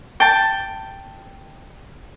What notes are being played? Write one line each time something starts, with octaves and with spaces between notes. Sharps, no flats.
G5 A5